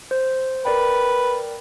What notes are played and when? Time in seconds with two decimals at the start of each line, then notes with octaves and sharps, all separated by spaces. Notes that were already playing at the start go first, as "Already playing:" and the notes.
0.11 C5
0.65 A#4 B4 D5 G5